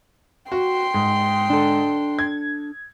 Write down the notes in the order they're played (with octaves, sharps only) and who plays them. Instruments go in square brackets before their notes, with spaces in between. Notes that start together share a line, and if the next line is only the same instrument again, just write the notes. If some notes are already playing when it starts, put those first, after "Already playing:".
[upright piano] F#4 [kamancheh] G5 C6
[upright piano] G#2
[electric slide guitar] D4 A4
[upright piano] G#6